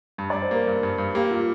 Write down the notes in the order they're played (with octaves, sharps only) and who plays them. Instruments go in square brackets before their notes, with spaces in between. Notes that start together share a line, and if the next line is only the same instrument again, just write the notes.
[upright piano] G2
[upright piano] G2 [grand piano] D5
[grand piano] C5
[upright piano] A#3 [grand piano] A#4
[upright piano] G2
G2
G2
[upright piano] A#3 [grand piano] G4
[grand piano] F4